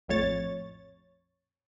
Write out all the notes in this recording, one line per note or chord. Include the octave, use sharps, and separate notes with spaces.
A#1 F2 A2 C#5 A6